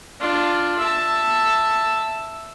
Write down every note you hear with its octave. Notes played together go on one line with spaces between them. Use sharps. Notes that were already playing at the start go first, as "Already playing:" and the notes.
D4 F4
E5 A5